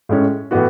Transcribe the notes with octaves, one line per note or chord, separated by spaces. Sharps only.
A2 G#3 C#4
A2 E3 B3 F#4